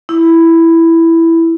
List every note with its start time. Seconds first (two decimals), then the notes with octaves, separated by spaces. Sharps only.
0.09 E4